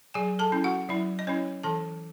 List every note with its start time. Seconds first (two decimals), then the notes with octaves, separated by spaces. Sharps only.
0.14 F#3 G#4 G#5
0.39 A4 A5
0.52 C#4 E4
0.64 F#4 F#5
0.89 F#3 E4 E5
1.19 D#5
1.27 C#4 E4 C#5
1.63 E3 A4 A5